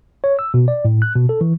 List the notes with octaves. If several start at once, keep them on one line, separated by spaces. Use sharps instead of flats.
C#5
E6
B2
D5
A2
F#6
B2
A4
E3